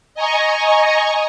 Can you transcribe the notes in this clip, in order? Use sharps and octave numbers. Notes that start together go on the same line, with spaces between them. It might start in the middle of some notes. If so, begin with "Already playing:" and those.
D#5 G#5 A#5 C#6